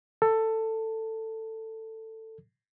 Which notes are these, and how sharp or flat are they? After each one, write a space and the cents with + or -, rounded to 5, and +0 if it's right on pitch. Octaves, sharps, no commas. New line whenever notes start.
A4 +15